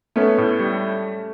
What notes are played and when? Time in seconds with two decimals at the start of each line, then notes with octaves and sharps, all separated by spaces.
0.16 A3 B3 C#4
0.38 A2
0.59 G3